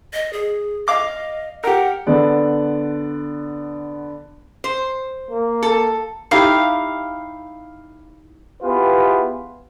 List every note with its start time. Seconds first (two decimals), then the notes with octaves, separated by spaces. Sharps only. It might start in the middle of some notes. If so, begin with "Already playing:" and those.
0.13 D#5
0.33 G#4
0.88 D#5 F5 D6
1.64 G4 A#4 F#5
2.07 D3 B3 D5
4.64 C5
5.31 A#3
5.63 A4
6.31 D#4 E4 G4 F5
8.63 B3 E4 F4 G4 G#4 B4